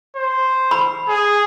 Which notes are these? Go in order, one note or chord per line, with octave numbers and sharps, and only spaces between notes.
C5
B5
G#4